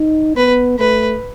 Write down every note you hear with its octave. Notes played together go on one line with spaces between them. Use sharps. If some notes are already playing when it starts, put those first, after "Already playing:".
Already playing: D#4
B3 B4
A3 B4